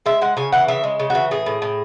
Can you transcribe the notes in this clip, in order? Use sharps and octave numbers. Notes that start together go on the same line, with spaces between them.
G#3 E5
G#3 F#5
C#3 G#5
E3 F#5
C#3 E5
G#3
C#3
E3 F#4
A2 G#4
A2
A2